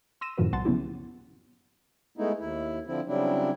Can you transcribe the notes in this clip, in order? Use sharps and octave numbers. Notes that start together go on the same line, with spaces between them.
C6 E6 A#6 D#7 E7
F#2 A2 D#3 F3 F#4 B4
C2 G3 F#5 A5 C6 A6
C#3 F#3 B3 C#4 E4 G4
G#3 A3 B3 D#4 E4
D#2 E4
D3 F3 C4 E4
C#3 F#3 G3 C4 D4 E4